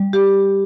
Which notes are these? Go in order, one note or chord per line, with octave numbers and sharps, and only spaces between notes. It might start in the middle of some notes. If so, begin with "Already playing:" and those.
Already playing: G3
G4